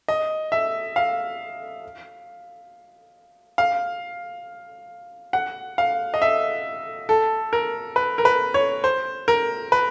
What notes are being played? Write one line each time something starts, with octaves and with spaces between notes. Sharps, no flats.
D#5
E5
F5
F5
F#5
F5
D#5
E5
A4
A#4
B4
A#4
B4
C#5
C5
A#4
B4